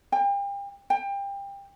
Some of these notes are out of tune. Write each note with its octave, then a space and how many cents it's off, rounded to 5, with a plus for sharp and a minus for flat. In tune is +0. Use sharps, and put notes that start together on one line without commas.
G5 +35
G5 +25